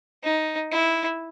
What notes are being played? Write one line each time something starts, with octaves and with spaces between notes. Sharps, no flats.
D#4
E4